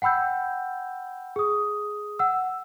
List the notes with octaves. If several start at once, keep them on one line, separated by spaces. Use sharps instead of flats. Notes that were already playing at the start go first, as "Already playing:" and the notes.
F#5 G5 B5 E6 G6
G#4 D#6
F#5 E6